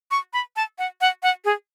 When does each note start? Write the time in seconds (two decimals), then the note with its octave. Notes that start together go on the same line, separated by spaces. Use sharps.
0.11 C#6
0.33 B5
0.56 A5
0.78 F#5
1.01 F#5
1.23 F#5
1.45 G#4